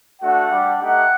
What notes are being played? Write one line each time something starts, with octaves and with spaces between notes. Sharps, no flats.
A3 D4 F#4 F#5
G3 D4 G4
A3 D#4 G4 F#5